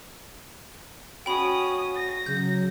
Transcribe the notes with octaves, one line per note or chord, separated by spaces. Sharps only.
C#4 F#4 G5 B5 D#6
A#6
C#3 F#3 G6